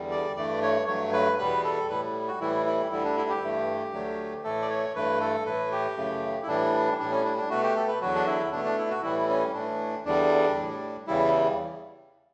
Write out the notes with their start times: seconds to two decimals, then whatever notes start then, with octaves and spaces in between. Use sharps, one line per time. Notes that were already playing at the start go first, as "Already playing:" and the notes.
Already playing: E2 D3 G3
0.11 D5
0.36 G2 E3 A3 D5
0.62 C#5
0.87 G2 F#3 A3 C#5
1.13 B4
1.38 E2 B2 G3 B4
1.64 A4
1.89 A2 G3 B4
2.28 F#4
2.40 A2 E3 G3 E4
2.66 E4
2.91 D2 D3 G3 E4
3.04 D4
3.17 E4
3.30 G4
3.42 G2 E3 A3
3.93 D2 D3 F#3 A3
4.44 A2 E3 A3 A4
4.62 D5
4.70 C#5
4.95 G2 E3 A3 B4
5.21 A4
5.46 A2 E3 A3 B4
5.72 G4
5.97 F#2 C#3 E3 A3
6.43 E4
6.48 A2 E3 G3 D4
6.99 A2 G3 D4
7.11 C#4
7.25 D4
7.38 D4
7.50 B2 A3 F#4
7.63 G4
7.76 A4
7.88 B4
8.01 E2 D3 F#3 F#4
8.15 D4
8.26 E4
8.52 B2 A3 D4
8.65 D4
8.78 E4
8.90 F#4
9.02 A2 E3 G3 E4
9.29 C#4
9.54 A2 E3 A3 D4
10.05 E2 D3 G3 D4
10.56 A2 G3
11.07 E2 C#3 E3 G3 E4